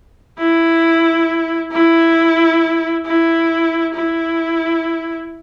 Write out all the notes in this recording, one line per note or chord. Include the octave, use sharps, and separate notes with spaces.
E4
E4
E4
E4